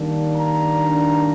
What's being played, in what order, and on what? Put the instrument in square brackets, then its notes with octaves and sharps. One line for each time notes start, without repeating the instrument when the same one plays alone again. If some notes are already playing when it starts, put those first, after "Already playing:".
Already playing: [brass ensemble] D#3 G3 A#3 D4
A#5